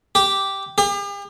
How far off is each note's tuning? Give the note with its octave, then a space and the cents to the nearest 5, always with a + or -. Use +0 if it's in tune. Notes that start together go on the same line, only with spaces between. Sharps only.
G4 -5
G4 +45